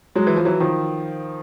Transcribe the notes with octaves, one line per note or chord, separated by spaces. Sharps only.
F#3 G#3
E3
F3
E3 F#3
D#3 F3